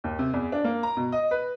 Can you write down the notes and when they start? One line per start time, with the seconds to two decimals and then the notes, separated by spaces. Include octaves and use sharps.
0.04 D#2
0.19 C3
0.33 E2
0.52 D4
0.64 A#3
0.83 A#5
0.97 B2
1.12 D#5
1.31 B4